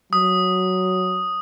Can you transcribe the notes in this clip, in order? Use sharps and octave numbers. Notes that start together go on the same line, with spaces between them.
F#3 D#6